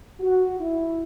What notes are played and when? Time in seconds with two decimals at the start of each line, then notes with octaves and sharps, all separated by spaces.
0.21 F#4
0.60 E4